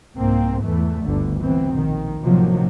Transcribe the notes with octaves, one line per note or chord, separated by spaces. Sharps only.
C2 G#2 A#3 C4
E2 E3 A3
G1 D2 D3
B2 E3 C4
A#1 D#3
A1 C3 D#3 F3 F#3 A#3